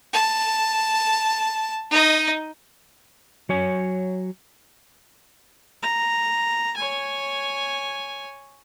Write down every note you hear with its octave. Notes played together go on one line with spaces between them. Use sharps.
A5
D#4 D#5
F#3 C#5 G#5
A#5
C#5 G#5